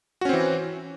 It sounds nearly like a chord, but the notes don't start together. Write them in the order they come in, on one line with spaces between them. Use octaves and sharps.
F#4 C#4 C4 E3